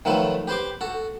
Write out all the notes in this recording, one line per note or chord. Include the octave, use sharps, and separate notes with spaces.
D#3 F3 F#3 A3 B4
G4 B4 C5 C6 D6
F#4 A4